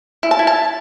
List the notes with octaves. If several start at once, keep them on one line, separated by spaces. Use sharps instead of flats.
E4
A5
E4
A5